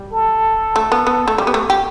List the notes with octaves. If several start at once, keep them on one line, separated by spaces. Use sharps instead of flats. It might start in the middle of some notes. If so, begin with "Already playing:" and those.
Already playing: G3
A4
A3
B3
B3
A3
G3 G4
B3
A3
G4